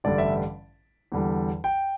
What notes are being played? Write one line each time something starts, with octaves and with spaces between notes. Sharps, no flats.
A1 G2 D3 G3 D5
E5
E2 D3 G3
G5